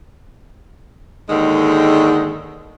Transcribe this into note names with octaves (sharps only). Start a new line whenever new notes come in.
D#2 G#2 D3 D#3 G#3